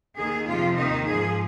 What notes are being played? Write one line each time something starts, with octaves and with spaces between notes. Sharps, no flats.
D#2 D#3 G#4
F2 C3 F3 F4
D#2 D#3 D#4
G#2 F3 G#4